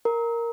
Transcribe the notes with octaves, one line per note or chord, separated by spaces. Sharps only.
A#4